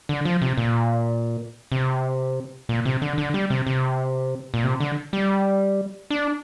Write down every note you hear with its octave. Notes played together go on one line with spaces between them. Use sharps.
D3
F3
C3
A#2
C3
A#2
C3
D3
D3
G3
C3
C3
A#2
C3
D3
G3
D4